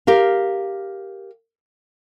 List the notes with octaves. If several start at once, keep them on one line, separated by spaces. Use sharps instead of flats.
G4 A#4 F5